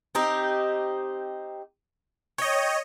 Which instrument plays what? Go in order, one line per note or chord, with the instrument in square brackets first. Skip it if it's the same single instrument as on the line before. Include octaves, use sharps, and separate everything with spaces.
[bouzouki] C4 D#4 G4
[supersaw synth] C#5 D#5 [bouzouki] G5